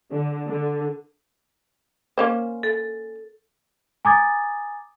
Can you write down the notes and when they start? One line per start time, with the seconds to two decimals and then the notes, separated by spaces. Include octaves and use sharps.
0.13 D3
0.49 D3
2.18 A#3 C#4 C5
2.63 A4
4.05 G#5 A#5 D6 D#6 G#6 A6